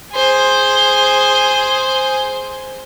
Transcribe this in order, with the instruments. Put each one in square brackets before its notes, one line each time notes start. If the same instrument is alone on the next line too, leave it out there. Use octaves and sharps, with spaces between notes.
[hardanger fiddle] G#4 C5